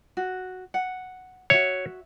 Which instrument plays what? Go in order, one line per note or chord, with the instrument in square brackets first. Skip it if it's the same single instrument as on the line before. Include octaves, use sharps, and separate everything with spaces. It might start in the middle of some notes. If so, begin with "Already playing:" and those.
[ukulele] F#4
F#5
[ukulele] F#4 E5 [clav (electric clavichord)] C#5